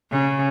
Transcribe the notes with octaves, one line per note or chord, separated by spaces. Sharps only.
C#3